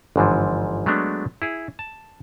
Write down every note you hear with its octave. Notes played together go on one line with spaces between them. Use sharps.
G1 G#2 E3 F3
F#3 G#3 A3 B3 D4
E4 G#4
A5